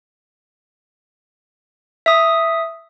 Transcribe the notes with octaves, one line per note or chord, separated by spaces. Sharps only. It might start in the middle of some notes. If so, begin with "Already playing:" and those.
E5 D#6